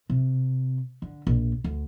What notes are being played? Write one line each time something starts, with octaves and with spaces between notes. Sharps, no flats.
C3
D3
A#1
D2